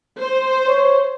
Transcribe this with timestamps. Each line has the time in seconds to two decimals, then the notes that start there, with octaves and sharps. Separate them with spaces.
0.18 C5
0.68 C#5